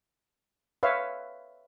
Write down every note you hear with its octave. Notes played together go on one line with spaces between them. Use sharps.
B4 C#5 E5 F5